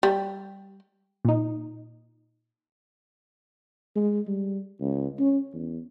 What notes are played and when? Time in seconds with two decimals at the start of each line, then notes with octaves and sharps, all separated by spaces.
0.03 G3
1.25 A#2 D#4
3.95 G#3
4.27 G3
4.81 C#2
5.19 C#4
5.53 E2